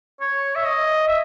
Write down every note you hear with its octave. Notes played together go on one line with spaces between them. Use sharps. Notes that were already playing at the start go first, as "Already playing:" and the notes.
C#5
E5
D#5
E5